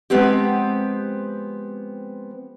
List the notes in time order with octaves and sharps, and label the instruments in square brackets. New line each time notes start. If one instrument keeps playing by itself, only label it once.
[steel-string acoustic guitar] F3 G#3 B3 C4 G4